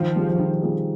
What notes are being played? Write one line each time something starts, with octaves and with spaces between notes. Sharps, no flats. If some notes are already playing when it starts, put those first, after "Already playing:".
Already playing: D#3 F3
G3 C4 F4 G#4
D#3
G3 C4 F4 G#4